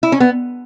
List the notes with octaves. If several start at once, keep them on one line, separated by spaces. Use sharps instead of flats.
E4
C#4
B3